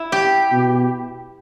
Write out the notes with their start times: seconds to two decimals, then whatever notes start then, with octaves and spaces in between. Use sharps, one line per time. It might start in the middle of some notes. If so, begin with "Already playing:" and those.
Already playing: E4
0.12 G4
0.52 B2